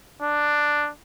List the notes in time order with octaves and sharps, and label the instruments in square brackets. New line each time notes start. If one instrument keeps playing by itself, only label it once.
[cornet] D4